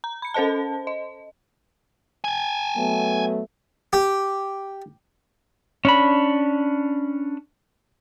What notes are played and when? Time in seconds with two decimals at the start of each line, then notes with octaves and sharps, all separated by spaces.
0.04 A#5
0.22 B5 C#7
0.34 C#4 A4 C5 D#5 A5
0.87 D#5
2.24 G5 G#5
2.77 F#3 A3 B3
3.93 G4
5.85 C#4 D4 B5